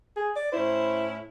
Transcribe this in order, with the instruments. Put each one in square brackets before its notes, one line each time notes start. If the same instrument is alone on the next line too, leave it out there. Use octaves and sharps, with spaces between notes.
[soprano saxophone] G#4
D5
[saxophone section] A2 C#4 E4 [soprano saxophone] C5